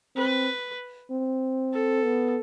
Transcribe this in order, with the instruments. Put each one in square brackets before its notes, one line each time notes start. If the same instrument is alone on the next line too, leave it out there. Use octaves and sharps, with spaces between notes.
[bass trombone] C4 [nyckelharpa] B4
[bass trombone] C4
[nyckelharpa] A4
[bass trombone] B3